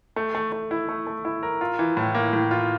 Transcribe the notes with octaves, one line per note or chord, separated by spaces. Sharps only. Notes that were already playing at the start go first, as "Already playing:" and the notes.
A3
A3
A3
E4
A3
A3
E4
A#4
F4
E3
A2
A#3
A2
F4